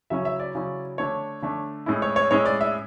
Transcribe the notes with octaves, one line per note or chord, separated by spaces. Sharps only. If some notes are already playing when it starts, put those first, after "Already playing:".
C#3 F#3 C#4 E4 E5
E5
D5
C#3 F#3 C#4 E4
D3 A3 D4 C#5
D3 A3 D4
A2 G#3 C#4 E4
C#5
C#5
A2 G#3 C#4 E4 C#5
D5
E5